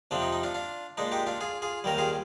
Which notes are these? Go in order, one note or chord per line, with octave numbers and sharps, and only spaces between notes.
F2 C3 F3 C4 D4
D#4
D#4
D4 F4
D4 F4
A#2 G#3 D4 D#4
D#4 G4
D4 F4
F4 G#4
F4 G#4
D#2 D#3 G3 A#4
F4 G#4